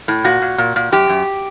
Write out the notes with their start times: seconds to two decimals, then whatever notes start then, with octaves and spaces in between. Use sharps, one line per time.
0.08 A2
0.24 A#2 F#4
0.42 A#2
0.58 A#2
0.76 A#2
0.92 F#2 G4
1.09 F#2